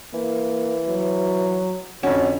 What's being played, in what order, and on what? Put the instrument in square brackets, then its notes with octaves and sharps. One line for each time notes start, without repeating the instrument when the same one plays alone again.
[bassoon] E3 [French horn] A#3
[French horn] F#3
[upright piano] F2 C#4 [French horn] D3 [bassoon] F#4